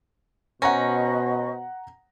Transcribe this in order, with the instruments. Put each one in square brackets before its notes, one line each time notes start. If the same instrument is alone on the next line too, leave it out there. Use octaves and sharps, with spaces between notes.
[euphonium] B2 [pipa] C#4 [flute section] C5 D#5 C#6 [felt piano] F#5 A#5 A#6